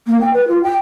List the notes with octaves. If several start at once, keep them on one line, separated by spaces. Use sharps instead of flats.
A#3
G5
B4
F4
G5